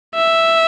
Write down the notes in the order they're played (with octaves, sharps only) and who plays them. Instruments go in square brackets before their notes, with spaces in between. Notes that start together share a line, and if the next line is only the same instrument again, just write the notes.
[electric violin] E5